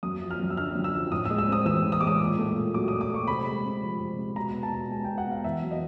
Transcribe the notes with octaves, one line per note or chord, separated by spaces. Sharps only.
F#2 D#6
F3
F6
F#2
E6
D3 F6
F#2
E6
F3
A2 D#6
E6
G#3
E6
C4 D#6
E3 E6
A2
D#6
G#3 D6
D#6
A#2
A3
A#2
F#3 D6
A#2 D#6
D6
A3 C#6
C3 B5
G#3
C4
F3
C3
G#3
B2 A#5
B3
A5
B2
G#3 G#5
B2 G5
F#5
B3 F5
E2 E5
F#3
D#5